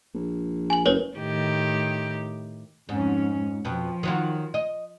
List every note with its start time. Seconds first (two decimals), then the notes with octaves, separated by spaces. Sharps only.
0.14 A#1
0.70 G#5 F#7
0.86 F#1 A#4 B4 C#5
1.16 A2 D#3 G4
2.89 F2 G#2 C#4
3.65 F2 B2 F3
4.03 D#3 F#3 F4
4.54 D#5